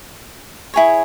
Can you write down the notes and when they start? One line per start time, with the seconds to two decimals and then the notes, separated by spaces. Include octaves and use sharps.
0.74 E4 G#4 C#5